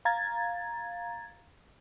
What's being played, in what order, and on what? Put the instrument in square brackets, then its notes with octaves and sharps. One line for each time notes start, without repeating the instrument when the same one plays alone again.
[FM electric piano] F5 A#5 G#6 A6